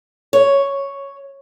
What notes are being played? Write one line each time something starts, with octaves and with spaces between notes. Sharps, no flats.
C#5